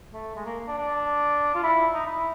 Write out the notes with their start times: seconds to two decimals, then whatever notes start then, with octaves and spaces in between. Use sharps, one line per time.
0.14 A3
0.36 G#3
0.45 A#3
0.67 D4
0.78 D4
1.55 F4
1.63 E4
1.94 D#4
2.06 E4